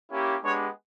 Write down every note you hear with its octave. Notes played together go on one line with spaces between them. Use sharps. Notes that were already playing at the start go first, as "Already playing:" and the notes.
A#3 C#4 E4 G4
G#3 B3 D4 G4 C#5